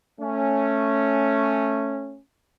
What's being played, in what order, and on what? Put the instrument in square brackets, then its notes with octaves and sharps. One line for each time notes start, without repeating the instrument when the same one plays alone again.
[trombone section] A3 C#4